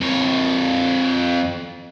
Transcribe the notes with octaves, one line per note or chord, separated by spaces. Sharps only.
F2 C#5